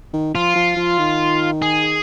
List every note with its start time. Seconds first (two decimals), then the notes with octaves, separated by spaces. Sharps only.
0.13 D#3
0.35 F3 F4
0.56 F3
0.77 F3
0.99 D#3
1.62 G#4